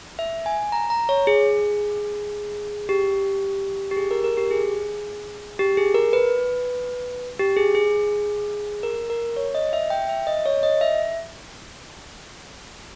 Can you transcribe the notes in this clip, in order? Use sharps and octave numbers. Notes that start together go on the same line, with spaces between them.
E5
G#5
A#5
A#5
C#5
G#4
G4
G4
G#4
A#4
A#4
G4
G#4
G4
G#4
A#4
B4
G4
G#4
G#4
A#4
A#4
C#5
D#5
E5
G5
E5
D#5
C#5
D#5
E5